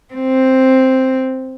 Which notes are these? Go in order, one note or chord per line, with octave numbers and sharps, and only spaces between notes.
C4